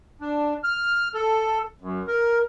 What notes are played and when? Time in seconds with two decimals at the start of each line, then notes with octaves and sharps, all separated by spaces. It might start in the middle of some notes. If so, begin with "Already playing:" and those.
0.21 D4
0.64 F6
1.14 A4
1.81 F#2
2.07 A#4